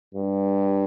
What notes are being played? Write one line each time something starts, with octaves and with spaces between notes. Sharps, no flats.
G2